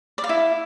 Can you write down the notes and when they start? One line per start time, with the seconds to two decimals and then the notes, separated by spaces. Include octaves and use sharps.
0.18 D5
0.24 F5
0.29 E4